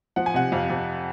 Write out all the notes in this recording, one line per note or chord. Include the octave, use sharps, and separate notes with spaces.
F3 F#5
G#5
C3 F#5
F2 F5
F2